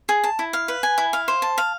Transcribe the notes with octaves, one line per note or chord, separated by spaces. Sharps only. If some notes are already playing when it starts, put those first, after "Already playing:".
G#4
A5
E4
F5
B4
G#5
E4
F5
C5
A5
F5